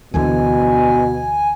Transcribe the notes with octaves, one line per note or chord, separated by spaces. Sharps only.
D2 B2 D3 E3 G#5